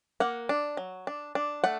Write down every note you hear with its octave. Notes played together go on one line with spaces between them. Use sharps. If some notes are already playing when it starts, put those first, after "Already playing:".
A#3 F#5
D4
F#3
D4
D4
A3 F#5